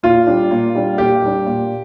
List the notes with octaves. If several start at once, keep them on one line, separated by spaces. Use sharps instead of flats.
A#2 F4
G3 D4
A#2
G3 D4
A#2 G4
G3 D4
A#2